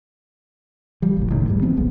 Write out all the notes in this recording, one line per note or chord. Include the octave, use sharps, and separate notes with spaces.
F3 G3
F#1 B1 A2
C#2 A2 D#3
D#1 E2 G#2 G3
F3 G#3 B3 C4
D#1 B1 G#3 B3